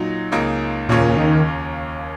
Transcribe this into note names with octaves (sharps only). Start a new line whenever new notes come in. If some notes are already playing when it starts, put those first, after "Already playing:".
Already playing: A#2 F#3 D#4
C#2 C#3 A#3 D#4
D#2 A#2 C#3 A#3 C#4
D#3